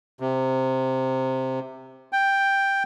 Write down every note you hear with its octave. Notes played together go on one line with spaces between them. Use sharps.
C3
G5